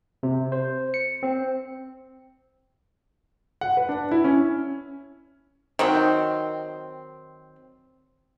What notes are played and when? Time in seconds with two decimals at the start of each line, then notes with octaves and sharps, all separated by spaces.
0.23 C3
0.52 C5
0.94 C#7
1.23 C4
3.61 F#5
3.77 B4
3.89 D4
4.11 E4
4.24 C#4
5.79 D#3 F#3 C4